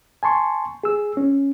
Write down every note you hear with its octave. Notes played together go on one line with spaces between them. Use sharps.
G#5 A5 C6 C#6
G#4 E6
C#4